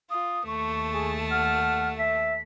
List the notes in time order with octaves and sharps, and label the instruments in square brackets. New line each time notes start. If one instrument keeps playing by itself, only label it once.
[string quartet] F4 [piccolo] D#6
[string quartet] D#2 A3 A5 [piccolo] C#6
[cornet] G#4
[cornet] F#5 [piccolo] F6
[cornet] E5 [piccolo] B6